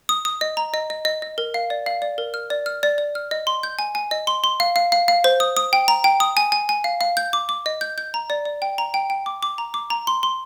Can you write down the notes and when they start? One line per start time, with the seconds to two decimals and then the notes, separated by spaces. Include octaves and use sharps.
0.09 D#6
0.25 D#6
0.41 D#5
0.57 A#5
0.74 D#5
0.90 D#5
1.05 D#5
1.22 D#5
1.38 A#4
1.54 F5
1.70 D5
1.86 F5
2.02 D5
2.18 A#4
2.34 F6
2.50 D5
2.66 F6
2.83 D5
2.98 D5
3.15 F6
3.31 D#5
3.47 C6
3.63 G6
3.79 G#5
3.95 G#5
4.11 D#5
4.27 C6
4.44 C6
4.60 F5
4.76 F5
4.92 F5
5.08 F5
5.24 C5
5.40 D#6
5.57 D#6
5.73 G5
5.88 A#5
6.04 G5
6.20 D#6
6.37 G#5
6.52 G#5
6.69 G#5
6.84 F5
7.01 F5
7.17 G6
7.33 D6
7.49 D6
7.66 D#5
7.81 G6
7.98 G6
8.14 A#5
8.30 D5
8.45 D5
8.62 G5
8.78 A#5
8.94 G5
9.10 G5
9.26 D6
9.43 D6
9.58 A#5
9.74 D6
9.90 A#5
10.07 C6
10.23 C6